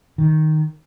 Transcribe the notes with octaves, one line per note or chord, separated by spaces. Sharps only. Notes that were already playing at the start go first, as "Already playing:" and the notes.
D#3